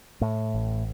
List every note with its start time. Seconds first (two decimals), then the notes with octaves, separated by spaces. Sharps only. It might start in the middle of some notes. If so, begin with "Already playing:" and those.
0.21 A2
0.54 A1